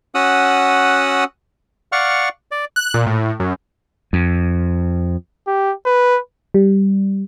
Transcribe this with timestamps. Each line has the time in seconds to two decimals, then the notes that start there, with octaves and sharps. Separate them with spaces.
0.15 C#4 F#4 F#5 D#6 E6 F#6
1.92 D5 F5 F#5 C#6 F6
2.51 D5
2.76 F#6
2.94 A#2
3.07 A2
3.40 F#2
4.13 F2
5.47 G4
5.86 B4
6.54 G3